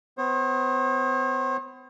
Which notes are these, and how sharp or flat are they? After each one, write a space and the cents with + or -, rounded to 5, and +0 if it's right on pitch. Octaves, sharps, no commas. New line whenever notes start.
B3 +40 C5 +45